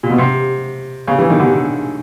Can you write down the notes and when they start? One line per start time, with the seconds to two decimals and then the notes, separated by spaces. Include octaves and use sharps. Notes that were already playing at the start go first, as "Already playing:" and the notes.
0.03 A#2
0.10 B2
0.18 C3
1.08 C#3
1.18 E3
1.30 D#3
1.40 D3